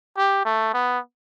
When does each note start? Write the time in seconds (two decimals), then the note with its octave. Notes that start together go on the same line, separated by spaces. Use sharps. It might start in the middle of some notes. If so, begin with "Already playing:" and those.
0.17 G4
0.45 A3
0.73 B3